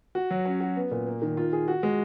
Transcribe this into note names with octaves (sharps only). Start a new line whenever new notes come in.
F#4
F#3
C#4
F#4
B3
A#2
A#3
D#3
F4
G#4
F#4
G#3